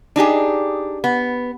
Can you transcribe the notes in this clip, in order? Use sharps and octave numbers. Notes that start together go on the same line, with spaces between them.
D4 D#4 G4 G#4
B3